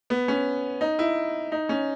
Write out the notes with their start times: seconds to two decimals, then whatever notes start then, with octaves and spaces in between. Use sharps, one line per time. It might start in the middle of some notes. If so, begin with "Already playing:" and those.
0.10 B3
0.28 C#4
0.81 D#4
0.99 E4
1.52 D#4
1.69 C#4